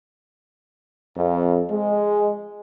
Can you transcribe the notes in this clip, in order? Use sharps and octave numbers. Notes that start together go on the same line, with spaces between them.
F2
G#3